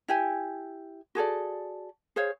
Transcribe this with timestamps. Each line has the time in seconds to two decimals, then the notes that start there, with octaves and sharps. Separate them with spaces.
0.08 E4 G4 G#5
1.15 F#4 G#4 A4 D5
2.16 G#4 C5 C#5 F5